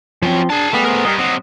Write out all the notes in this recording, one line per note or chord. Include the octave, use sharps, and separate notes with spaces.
F3 F#3 C4 C#4
D4 G#4 A5
G3 A3 B3 G#4
C4 A#4
G2 G4 A#4 D#5
C3 F#3 D#5